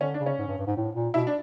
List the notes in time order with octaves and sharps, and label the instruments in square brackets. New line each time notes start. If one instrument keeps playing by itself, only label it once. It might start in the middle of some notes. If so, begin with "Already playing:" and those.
[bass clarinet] D3 [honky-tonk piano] C#4
[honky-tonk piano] D4
[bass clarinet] C#3
[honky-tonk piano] C#4
[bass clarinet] G#2
G2
G2
G#2
A2
A#2
[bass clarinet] B2 [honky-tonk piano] E4
[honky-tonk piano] D4